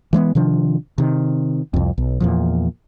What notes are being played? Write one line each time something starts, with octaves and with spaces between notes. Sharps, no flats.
E3 G#3 A#3 B3
C3 D#3 F3 D4
C3 D#3
C2 F2
B1
E2 A#2 F3